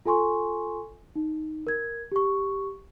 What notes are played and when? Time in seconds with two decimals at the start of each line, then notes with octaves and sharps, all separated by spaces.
0.05 F4 A4 G#5 C6 C#6
1.15 D#4
1.67 A#4 G#6
2.12 G4 C#6